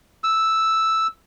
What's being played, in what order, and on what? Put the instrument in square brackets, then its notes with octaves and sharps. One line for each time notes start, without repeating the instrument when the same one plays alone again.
[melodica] E6